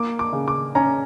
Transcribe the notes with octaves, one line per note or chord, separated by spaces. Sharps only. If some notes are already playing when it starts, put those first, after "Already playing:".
Already playing: A#3 D6
D6
C#3
D6
C#4 A#5